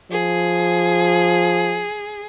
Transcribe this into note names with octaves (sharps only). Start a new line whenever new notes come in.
F3 G#4